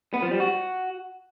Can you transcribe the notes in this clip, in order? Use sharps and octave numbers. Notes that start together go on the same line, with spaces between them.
B3
F3
G3
F#4